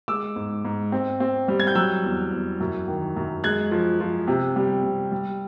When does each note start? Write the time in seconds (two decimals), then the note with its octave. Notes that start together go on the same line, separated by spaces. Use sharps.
0.08 G#3 D6 E6
0.36 G#2
0.65 G#2
0.92 C4
1.20 C4
1.48 G3
1.60 G#6
1.67 G6
1.75 F#3 E6 F#6
2.03 E2
2.32 E2
2.60 F#2
2.88 D#3
3.16 F#2
3.44 G#3 F#6 G#6
3.71 F3
4.00 F3
4.28 C3
4.56 G3
4.83 C3
5.12 G3